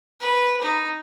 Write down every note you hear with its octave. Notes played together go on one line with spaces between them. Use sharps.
B4
D#4